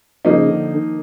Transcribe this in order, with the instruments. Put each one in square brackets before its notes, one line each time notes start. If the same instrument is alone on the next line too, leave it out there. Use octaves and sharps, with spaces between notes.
[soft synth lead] C#3 [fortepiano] F3 A#3 D#4
[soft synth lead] D3
D#3